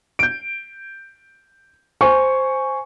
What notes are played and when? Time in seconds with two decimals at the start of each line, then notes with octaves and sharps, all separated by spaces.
0.19 G6 D7
2.01 C5 G#5 C#6